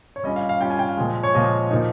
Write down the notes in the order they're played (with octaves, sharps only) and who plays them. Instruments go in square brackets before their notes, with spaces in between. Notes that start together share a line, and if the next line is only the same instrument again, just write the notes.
[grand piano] C#5
G3 C#4 F4 D#5
F5
F5
G3 C#4 F4 G5
G#5
G5
F5
A#2 F3 G#3
C#5
A#2 F3 G#3 D#5
A#2 F3 A#3 D#4